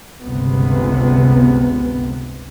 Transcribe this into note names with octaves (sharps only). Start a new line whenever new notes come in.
G1 C#2 C3 B3